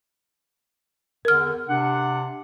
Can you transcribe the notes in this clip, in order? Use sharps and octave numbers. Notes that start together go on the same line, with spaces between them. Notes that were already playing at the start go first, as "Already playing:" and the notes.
E2 D3 A#4 F6
C3 D4 F#5